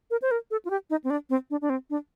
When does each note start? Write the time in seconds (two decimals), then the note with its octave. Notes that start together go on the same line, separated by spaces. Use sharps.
0.11 A#4
0.22 C5
0.31 A#4
0.51 A4
0.65 F4
0.70 G4
0.90 D#4
1.04 C4
1.10 D4
1.30 C4
1.50 D4
1.62 D4
1.70 C4
1.90 D4